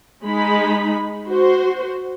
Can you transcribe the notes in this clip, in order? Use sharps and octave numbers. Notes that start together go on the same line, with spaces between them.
G#3 D#4 B5
F#4 C5